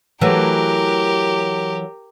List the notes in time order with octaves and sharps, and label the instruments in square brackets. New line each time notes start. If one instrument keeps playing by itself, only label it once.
[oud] E3 F#3 A3 [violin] G4 A#4